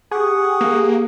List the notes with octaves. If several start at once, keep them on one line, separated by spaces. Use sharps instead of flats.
G4 G#4 F#5 C#6 D#6
A#3